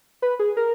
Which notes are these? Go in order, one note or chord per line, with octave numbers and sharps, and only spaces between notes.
B4
G#4
A#4